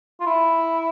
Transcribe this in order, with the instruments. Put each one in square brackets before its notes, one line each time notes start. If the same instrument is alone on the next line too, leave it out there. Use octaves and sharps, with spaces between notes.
[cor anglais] F4
E4